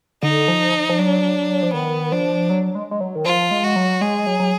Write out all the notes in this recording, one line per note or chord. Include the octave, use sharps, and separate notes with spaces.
D3 D#4
F3
F3
F#3 D4
F3
D#3 B3
F3 D4
F#3
G#3
G#3
F#3
D#3
F3 F4
G#3
F#4
F#3
G#3 G#4
F#3
F#3